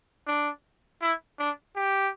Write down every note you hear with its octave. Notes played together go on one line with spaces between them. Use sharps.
D4
E4
D4
G4